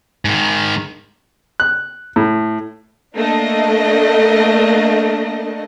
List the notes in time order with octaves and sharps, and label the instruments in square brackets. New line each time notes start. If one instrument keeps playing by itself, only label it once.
[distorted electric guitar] G#2 D#3
[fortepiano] F#6
A2
[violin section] A3 A#3 D4 D#5